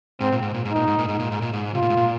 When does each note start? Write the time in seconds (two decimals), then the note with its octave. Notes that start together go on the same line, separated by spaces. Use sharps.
0.21 G#2 C4
0.32 A#2
0.42 G#2
0.54 A#2
0.65 G#2
0.72 A#2 D#4
0.87 G#2
0.99 A#2
1.08 G#2
1.20 A#2
1.32 G#2
1.42 A#2
1.53 G#2
1.75 C3 F4
1.82 A#2
1.90 G#2
1.97 A#2